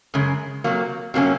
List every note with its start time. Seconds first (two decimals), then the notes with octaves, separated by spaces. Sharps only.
0.14 F#2 C#3 G#3
0.64 C3 F#3 A#3
1.14 C3 F#3 A#3 C#4